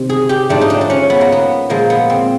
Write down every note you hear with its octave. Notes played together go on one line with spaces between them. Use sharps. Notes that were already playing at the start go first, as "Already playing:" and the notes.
Already playing: C3 D#3
G#4
G4
G#2 F3 A3 D4
D#4
D4
D4
C#4
B3
A#3
B3
A#2 F3 G#3 A#3
B3
C4